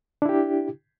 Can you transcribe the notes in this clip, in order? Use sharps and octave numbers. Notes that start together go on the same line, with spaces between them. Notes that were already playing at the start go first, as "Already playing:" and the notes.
D4 E4 G4